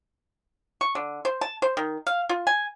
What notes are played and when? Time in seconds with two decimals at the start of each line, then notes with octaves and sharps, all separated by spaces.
0.81 C#6
0.95 D3
1.25 C5
1.41 A5
1.62 C5
1.77 D#3
2.07 F5
2.29 F4
2.47 G#5